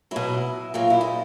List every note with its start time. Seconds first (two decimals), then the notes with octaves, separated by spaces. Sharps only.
0.11 B2 F#3 E4
0.74 A#2 F#3 F4
0.90 E4
1.01 D#4